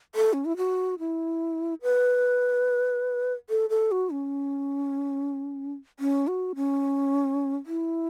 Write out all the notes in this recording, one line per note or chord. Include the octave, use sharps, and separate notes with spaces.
A4
C#4
E4
F#4
E4
B4
A4
A4
F#4
C#4
C#4
F#4
C#4
E4